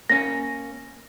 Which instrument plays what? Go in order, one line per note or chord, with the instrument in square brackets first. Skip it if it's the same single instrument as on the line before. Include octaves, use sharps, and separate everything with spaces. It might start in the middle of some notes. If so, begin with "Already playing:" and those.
[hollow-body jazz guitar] A#3 C#4 [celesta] A#6